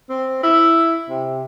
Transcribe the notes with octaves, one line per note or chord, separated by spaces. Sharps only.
C4
E4
C3